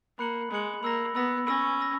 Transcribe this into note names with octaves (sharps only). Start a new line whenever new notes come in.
A#3 B5 F#6 C#7 F#7
G#3 B5 F#6 C#7 F#7
A#3 B5 E6 A#6
B3 B5 E6 A#6
C#4 B5 E6 A#6
B5 E6 A#6